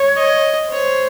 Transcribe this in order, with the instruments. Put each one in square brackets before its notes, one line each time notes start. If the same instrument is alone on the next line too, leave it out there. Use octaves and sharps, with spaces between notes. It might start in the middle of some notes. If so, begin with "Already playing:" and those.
Already playing: [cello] C#5
[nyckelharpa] D#5
[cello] C5 [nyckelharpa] C#5